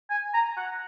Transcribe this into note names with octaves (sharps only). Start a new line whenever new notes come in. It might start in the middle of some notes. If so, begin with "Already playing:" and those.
G#5
A#5
F#5